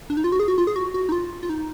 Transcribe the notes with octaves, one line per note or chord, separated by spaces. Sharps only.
D4
D#4
F4
F#4
G#4
F#4
F4
G#4
F#4
F#4
D#4
F4
F4
D#4